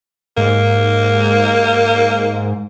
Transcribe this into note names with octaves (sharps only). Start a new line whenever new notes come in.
G#2 A#3